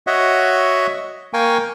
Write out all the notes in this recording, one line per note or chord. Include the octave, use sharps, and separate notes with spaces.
F#4 C#5 D#5 E5 F#5
A#3 A#4 F5 G5 G#5 C#6